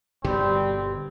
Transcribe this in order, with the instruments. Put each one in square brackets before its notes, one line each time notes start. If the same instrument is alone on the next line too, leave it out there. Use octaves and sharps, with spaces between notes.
[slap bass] G1 G2 B2 [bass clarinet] G3 [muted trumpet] C4 [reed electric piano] G4